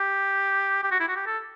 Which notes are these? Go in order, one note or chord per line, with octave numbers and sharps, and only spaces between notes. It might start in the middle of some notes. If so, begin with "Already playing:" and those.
Already playing: G4
G4
F#4
E4
F#4
G4
A4